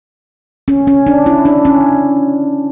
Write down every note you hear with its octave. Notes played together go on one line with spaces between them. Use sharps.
C#4
C#4
D4
E4
D4
C#4